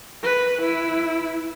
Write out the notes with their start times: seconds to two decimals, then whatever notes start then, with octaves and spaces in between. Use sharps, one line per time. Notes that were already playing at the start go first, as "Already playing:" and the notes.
0.23 B4
0.61 E4